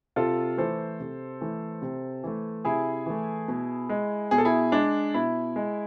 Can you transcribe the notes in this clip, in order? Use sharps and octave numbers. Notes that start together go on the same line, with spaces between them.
C3 F4 A4
E3 A3 A4 C5
C3
E3 A3
C3
E3 A3
C3 E4 G#4
E3 A3
B2
G#3
B2 G#4
A4
E4 G#4
G#3 D4
B2 E4
G#3